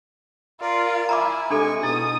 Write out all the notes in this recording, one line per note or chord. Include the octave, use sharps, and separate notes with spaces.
F4 A#4 D5
E4 G#5 A#5 B5 D6
C3 G#3 D4 A4 G#5 C#6
B2 E4 D#6